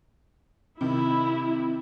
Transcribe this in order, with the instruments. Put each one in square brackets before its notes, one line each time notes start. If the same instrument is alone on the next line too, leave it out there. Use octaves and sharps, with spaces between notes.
[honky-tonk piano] C3 D#3 [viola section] E4